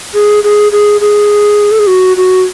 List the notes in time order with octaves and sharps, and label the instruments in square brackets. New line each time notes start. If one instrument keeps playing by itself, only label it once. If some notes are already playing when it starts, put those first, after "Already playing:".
[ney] G#4
G#4
G#4
G#4
A4
G#4
F#4
F#4